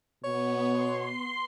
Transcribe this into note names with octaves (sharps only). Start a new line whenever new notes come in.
B2 B3 C#5
C6